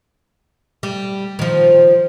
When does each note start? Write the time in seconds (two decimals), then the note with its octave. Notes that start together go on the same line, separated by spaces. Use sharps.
0.83 G3
1.39 D#3 F3